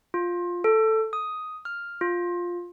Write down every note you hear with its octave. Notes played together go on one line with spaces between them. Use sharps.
F4
A4
D#6
F6
F4